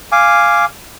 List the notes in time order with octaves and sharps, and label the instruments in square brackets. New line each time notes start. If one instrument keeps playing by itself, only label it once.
[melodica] F5 G#5 D6